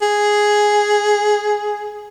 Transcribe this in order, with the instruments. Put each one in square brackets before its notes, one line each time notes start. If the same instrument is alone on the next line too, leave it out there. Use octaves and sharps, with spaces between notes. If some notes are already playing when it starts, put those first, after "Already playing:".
[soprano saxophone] G#4